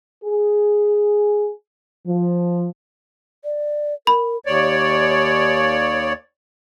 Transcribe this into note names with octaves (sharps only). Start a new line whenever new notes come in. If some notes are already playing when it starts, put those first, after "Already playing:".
G#4
F3
D5
A#4 B5
D#2 C#5 D5